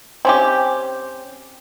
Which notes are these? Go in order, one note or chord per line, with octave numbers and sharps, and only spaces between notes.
C4 C#4 G4